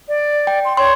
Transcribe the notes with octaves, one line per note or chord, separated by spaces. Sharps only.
D5
G5
C6
C#5 C6